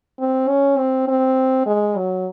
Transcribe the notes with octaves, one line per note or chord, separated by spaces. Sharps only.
C4
C#4
C4
C4
G#3
F#3